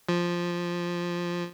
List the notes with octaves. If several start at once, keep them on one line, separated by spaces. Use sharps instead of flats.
F3